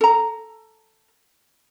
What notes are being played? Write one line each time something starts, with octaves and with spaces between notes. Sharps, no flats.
A4 A#5